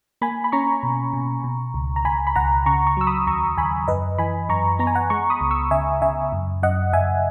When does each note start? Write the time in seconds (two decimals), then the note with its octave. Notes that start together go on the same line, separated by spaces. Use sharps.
0.22 A#3 G#5 B5
0.44 B5
0.52 C#4 A#5 C#6
0.83 B2
1.13 B2
1.44 B2
1.74 C#2
1.96 A#5
2.05 C#2 G#5 B5
2.27 B5
2.35 C#2 F#5 A#5
2.66 C#3 A#5 C#6
2.87 A#5 C#6
2.97 F#3 E6
3.07 B5 D#6
3.27 D#2 A#5 C#6
3.57 D#2 G#5 B5
3.88 F#2 B4 D#5
4.18 E3 G#5 B5
4.49 F#2 A#5 C#6
4.79 B3 A#5
4.87 G#5
4.95 F#5 A#5
5.10 G#3 A#5 C#6
5.30 B5 D#6
5.41 C#2
5.51 C#6 E6
5.71 C#3 E5 G#5
6.02 C#3 E5 G#5
6.32 F#2
6.63 F#2 D#5 F#5
6.93 F#2 E5 G#5